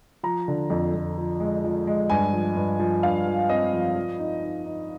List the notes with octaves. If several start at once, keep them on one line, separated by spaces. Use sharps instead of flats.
F3 A#5
D3
F2
F2
F3
G#3
F3
G#3
G2 G#5
F3
G2
F3
G2 F5
F3
C4 D#5
F3
F3
D#4
D#4
D#4